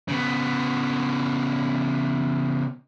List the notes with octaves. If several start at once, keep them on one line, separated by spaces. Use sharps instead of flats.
C#3 B3